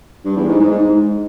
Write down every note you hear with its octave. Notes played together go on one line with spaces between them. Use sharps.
G2
E2
G#2
G#2
G#2